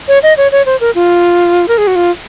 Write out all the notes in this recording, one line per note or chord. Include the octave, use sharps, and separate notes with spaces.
C#5
D#5
C#5
C#5
C5
A#4
F4
A#4
G#4
F#4
F4